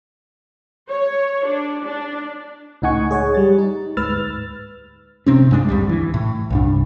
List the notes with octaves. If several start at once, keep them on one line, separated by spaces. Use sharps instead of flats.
C#5
D4
D4
C#2 A2 D#4 F#5 G#5 C#6
G#4 C#5 F#5 G#5
G3 A6
D#4
D2 G#2 B4 E6 F6 A6
C3 C4 C#4
G2 G#3 D4
D2 G2 G3
E3
A2
C2 G2 D4